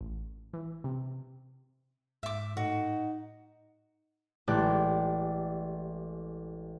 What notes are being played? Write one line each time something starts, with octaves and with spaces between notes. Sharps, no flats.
A1
E3
C3
G#2 E5 D6
A2 D#4 F#4
A1 G#3 G4 D5 F#6